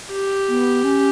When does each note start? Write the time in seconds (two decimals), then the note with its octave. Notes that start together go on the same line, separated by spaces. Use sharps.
0.12 G4
0.49 B3
0.84 C#4